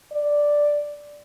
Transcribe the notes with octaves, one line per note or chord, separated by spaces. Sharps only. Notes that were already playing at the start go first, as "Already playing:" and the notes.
D5